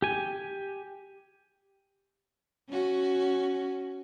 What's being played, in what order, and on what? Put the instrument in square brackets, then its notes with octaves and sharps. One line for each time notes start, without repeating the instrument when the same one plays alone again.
[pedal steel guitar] G4 G#5
[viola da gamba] C#4 F#4